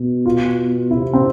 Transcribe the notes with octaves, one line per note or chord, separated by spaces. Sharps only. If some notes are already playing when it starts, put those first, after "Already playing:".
Already playing: B2
F4
C3 E4
C4